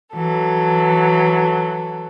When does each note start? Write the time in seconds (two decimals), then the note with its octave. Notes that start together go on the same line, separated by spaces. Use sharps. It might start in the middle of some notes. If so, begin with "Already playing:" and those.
0.13 E3 F#3 A4